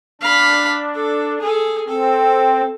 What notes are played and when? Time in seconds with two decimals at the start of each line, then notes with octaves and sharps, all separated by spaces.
0.21 D4 F5 B5
0.94 A4
1.40 G#4 A4
1.88 C4 A4